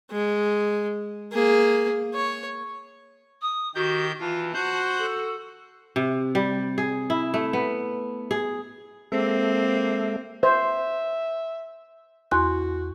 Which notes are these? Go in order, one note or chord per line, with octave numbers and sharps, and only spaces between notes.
G#3
A#3 G#4
C#5
D#6
D#3 F#4 G4 G6
E3 F4 A5
F#4 C5 F#6 G6
A4
C3
G3
G#4
E4
A3
B3
G#4
G#3 A#3 C4 A4 E5
C5 E5
E2 F#4 C6 F#6